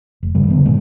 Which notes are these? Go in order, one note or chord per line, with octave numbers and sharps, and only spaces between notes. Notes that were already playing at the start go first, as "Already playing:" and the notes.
F1
G2 C#3 G3
D3 D#3 A3 B3
G#2 B2 G#3 C4